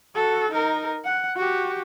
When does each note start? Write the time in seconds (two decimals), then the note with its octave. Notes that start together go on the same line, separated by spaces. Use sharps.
0.15 F#4 A4
0.51 D#4 A#4
1.05 F#5
1.36 F#4 G4